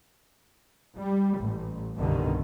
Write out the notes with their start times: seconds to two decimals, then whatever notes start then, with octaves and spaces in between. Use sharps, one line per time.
0.97 G3
1.39 A1
1.97 C2 G2 B2 D3 D#3